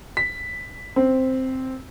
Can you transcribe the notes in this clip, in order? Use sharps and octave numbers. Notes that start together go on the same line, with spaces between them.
B6
C4